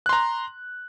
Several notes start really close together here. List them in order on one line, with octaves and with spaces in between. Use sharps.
F#6 C6 A#5